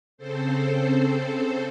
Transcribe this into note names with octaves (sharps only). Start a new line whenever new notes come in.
C#3 C4 A4 C5